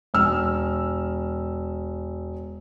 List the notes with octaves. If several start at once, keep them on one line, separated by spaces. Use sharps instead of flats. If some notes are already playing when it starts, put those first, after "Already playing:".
E1 E6 F6